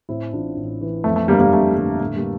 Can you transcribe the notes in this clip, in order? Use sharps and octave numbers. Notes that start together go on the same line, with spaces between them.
A2 C4 E4
A1 D4 F4
A1
E3
F2 A3
A3
G1 G3 A#3
G3 A#3
G1 A3
D3 G3
A2 A3
G3 A#3